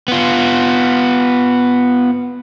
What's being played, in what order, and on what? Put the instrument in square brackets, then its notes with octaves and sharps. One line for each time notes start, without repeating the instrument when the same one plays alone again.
[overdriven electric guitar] B3 F4